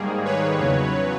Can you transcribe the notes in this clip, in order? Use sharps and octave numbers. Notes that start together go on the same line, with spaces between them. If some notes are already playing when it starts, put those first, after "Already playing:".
Already playing: G#2 D#3 G3 A#3 G#4
B4 C#5
E2 C#3 F#3